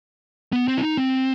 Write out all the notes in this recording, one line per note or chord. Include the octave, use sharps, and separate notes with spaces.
B3
C4
E4
D#4
C4